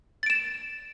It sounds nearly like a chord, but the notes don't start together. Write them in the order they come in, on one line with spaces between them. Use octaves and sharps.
A6 D7 E7